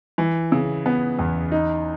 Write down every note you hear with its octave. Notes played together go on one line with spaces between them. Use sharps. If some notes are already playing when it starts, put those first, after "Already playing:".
E3
C#3
B3
E2
D#4